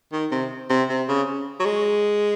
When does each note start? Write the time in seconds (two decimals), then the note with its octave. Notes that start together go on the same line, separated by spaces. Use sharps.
0.13 D#3
0.32 C3
0.70 C3
0.89 C3
1.09 C#3
1.60 F#3
1.66 G#3